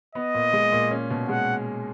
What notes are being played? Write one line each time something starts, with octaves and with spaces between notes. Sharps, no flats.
B3 D#5
A#2
G#3
A#2
C#4
B2
G#3 F#5